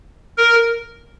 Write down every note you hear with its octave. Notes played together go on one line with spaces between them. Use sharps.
A#4